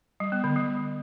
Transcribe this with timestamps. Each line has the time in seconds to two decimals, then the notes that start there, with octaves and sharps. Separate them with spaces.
0.20 G3
0.32 B3
0.44 D3
0.56 G3